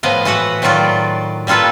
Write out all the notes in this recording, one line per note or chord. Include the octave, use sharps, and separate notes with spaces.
A2 F3 B3 D#5 F5
E3 F#4 B4 F#5
A2 D#3 F#3 F4 D5
G3 A#3 F4 A4 B4